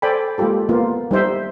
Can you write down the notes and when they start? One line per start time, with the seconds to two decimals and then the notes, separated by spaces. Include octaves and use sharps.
0.02 A4 C5 D5 G5 G#5 B5
0.38 G#3 A#3 F4 G4 A4
0.69 A#3 B3 F4
1.11 G3 D#4 C5 E5